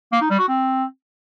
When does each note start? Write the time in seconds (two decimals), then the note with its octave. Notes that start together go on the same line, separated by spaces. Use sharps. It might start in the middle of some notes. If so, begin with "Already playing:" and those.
0.12 A#3
0.21 D#4
0.30 G3
0.39 F#4
0.48 C4